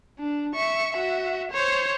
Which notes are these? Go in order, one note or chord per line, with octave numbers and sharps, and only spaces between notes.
D4
E5 C#6
F#4 E5
C5 C#5